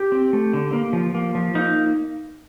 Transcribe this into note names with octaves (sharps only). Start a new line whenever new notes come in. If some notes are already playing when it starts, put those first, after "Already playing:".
Already playing: G4
C4
A3
D3
A#3
F3
A#3
F3
A#3 D#4